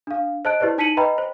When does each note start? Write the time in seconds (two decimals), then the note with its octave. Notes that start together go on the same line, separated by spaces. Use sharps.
0.07 D4 F5
0.45 C5 D#5 A5 F#6 D7
0.60 E4 G4 B4 C5 D5
0.78 D#4 A5 B6 C#7 D#7 F#7
0.97 B4 D#5 G5 A#5 B5
1.18 C5